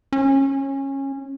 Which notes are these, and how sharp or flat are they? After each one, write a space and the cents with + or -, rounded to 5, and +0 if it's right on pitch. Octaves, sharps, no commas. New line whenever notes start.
C#4 -20